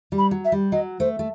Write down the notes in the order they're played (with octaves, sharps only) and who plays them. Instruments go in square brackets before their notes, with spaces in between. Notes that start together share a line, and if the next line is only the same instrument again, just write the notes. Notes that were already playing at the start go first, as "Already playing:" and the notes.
[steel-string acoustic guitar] G3
[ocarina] B5
[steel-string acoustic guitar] F#3
[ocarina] E5
[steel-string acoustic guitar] G3
[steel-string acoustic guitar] F#3 [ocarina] D#5
[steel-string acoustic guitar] A3 [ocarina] C5
[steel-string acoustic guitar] A3